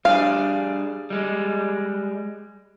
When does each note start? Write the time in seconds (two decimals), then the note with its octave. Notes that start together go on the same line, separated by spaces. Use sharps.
0.05 G3 D4 G#4 F5
1.10 G3 G#3